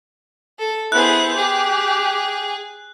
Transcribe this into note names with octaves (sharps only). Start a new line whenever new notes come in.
A4
B3 E4 G#4 C5 F#6
G4 G#4